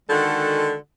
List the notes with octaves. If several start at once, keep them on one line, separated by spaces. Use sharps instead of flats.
D3 D#3 G#3 F#4 A4 F#5